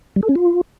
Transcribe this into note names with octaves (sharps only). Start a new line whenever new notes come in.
G3
A4
C#4
F4